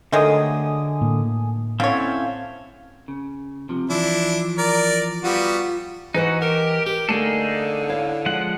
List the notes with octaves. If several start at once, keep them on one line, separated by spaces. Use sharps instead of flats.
D3 D#3 F#3 G#3 A3 G#5 D#6
A2 A#3
D3 C4 C#4 E4 C#5 F5
C#3
C3 F3
E3 F3 D4 E4
A#4 D5
G3 B3 F4 F#4
E3 D#4 F#4 B4 D#5
G4 A#4
G4 A#4
D3 A3 A#3 D#4 G#4 A4
E4 C#5 F5
F3 G#3 F#5